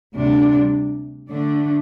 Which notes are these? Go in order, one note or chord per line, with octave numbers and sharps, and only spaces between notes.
D2 C3 G3 D4
D3 A3 D4